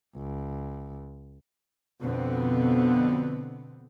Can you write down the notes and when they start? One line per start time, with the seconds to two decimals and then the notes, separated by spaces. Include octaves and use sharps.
0.17 C#2
2.00 F2 B2 D3 B3 C4